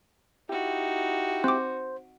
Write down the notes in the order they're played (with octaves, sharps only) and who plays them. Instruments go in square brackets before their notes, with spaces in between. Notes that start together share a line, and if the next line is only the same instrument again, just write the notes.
[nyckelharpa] D#4 F#4 [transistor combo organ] E4 G4
[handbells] C4 D6 [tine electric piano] C5